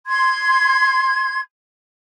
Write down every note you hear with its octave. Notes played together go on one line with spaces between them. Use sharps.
C6 G#6